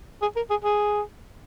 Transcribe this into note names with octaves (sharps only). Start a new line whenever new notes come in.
G#4
A#4
G#4
G#4